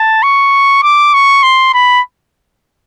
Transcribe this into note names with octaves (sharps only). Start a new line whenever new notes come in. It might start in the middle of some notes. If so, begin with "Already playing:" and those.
Already playing: A5
C#6
D6
C#6
C6
B5